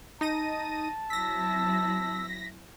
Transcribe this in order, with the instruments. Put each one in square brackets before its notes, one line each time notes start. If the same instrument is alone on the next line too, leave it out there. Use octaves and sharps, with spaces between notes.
[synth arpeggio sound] D#4 A#6 D#7 [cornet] A5
[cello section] F#3 C4 E4 [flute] E6 [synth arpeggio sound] A#6 B6